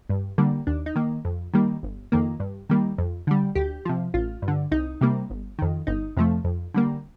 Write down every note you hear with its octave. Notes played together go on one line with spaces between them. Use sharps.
G2
D3 G3 A#3
D#2 D4
D#4
D#3 A#3
F2
D#3 G3 A#3
G1
F2 D#3 A#3
G2
D#3 G3 A#3
F2
D3 G3
D2 G4
C3 F3
A1 F4
G2
D3
C2 D#4
C3 G3 A#3
G1
F2 D#3
G1 D#4
F2 C3 F3 A3
F2
D3 G3 A#3